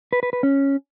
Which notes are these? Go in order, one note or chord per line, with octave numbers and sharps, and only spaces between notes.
B4
B4
B4
C#4